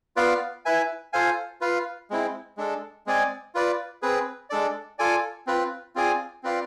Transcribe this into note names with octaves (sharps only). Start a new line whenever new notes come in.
B3 F4 B4 D5 F5
E4 B4 E5 G#5
F4 A4 C5 F5 G#5
F4 B4 F5
G#3 C4 E4
G#3 D4 A4
G#3 C4 G#4 D5 G#5
F4 B4 D5
C4 G#4 B4
G#3 D4 A4 D5
F4 A4 D5 G#5
C4 F4 B4
C4 F4 G#4 D5 G#5
C4 F4 B4 D5 F5